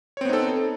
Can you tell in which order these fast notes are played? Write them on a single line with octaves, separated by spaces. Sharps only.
C#5 C4 B3 D#4 A4